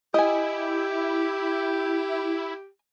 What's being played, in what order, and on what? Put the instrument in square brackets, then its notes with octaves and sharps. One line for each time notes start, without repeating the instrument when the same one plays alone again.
[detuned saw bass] E4 [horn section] G4 [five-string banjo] D#5 G#5